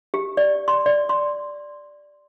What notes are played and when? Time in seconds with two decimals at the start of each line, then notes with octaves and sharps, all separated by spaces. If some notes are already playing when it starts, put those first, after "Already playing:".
0.14 G4
0.37 D5
0.68 C6
0.86 D5
1.09 C6